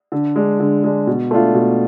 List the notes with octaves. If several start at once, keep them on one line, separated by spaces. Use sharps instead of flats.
D3
G#3 D4
D3
G#3 D4
B2
A3 D4 F4
B2